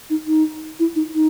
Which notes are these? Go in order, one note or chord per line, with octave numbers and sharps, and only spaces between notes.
D#4
D#4
E4
D#4
D#4